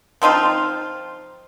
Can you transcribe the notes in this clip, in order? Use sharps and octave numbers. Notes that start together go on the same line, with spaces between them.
F3 C4 D#4 F4